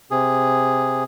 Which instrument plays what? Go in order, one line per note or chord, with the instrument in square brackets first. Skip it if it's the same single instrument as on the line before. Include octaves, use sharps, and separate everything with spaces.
[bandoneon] C3 G#4